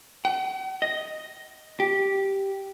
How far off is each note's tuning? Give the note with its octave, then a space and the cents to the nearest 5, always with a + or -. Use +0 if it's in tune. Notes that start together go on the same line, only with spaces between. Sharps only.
F#5 +45
D#5 +5
G4 -5